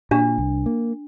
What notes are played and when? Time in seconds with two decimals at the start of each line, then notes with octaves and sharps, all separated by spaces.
0.11 A#2 D4
0.38 C2
0.66 A#3